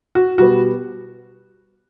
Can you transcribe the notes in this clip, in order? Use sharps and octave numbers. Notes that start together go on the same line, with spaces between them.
F#4
B2 G3 B3 F#4